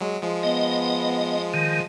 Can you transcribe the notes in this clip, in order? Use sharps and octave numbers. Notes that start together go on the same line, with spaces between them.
F#3 G#3
F3 G#3
B3 D#5
D#3